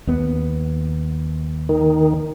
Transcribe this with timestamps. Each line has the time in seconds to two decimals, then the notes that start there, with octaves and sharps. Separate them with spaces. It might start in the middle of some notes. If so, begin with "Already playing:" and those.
0.07 D#2 B3
1.69 D#3